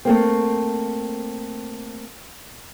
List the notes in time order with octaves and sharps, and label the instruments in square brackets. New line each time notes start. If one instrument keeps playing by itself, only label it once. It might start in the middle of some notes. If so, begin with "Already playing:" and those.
[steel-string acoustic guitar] A3 A#3 C4